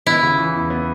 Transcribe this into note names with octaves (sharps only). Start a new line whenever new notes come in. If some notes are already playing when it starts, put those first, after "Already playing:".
B3 E4
C#3
E3
E2
B3